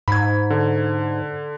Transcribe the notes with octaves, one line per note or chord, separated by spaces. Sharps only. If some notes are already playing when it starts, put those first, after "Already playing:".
G#2 B5 G#6
D3